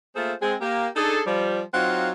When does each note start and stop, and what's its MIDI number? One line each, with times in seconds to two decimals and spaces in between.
0.16 0.33 57
0.16 0.33 58
0.16 0.33 65
0.16 0.33 68
0.16 0.33 69
0.16 0.33 72
0.42 0.56 56
0.42 0.56 60
0.42 0.56 68
0.61 0.89 58
0.61 0.89 67
0.96 1.20 62
0.96 1.20 63
0.96 1.20 68
0.96 1.20 69
1.27 1.62 53
1.27 1.62 55
1.74 2.11 54
1.74 2.11 60
1.74 2.11 63
1.74 2.11 65
1.74 2.11 77
1.74 2.11 78